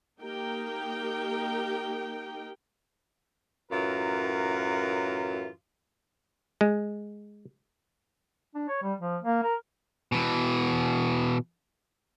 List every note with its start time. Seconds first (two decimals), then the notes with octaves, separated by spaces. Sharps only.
0.19 A#3 D#4 G4 A#4 G5
3.71 F#2 A2 E3 F4 A#4
6.61 G#3
8.55 D4
8.68 C#5
8.82 G3
9.00 F3
9.22 A#3
9.44 A#4
10.12 B2 E3